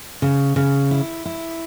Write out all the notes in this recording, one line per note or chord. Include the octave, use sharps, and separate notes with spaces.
C#3
C#3
E4
E4